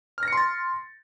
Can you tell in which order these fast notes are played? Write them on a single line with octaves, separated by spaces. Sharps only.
F6 A#6 C#7 C6 A6